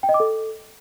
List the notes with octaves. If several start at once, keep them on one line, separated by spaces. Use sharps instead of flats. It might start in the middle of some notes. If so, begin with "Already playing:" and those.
G5
D#5
D6
A4